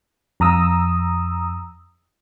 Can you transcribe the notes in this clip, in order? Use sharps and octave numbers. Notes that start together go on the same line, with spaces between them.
F2 A#5 D#6 E6